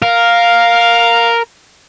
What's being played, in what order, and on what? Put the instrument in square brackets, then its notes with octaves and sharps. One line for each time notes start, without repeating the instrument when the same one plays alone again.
[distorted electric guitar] A#4 [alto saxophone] F5